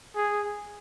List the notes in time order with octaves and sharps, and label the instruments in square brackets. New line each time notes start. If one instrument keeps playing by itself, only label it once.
[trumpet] G#4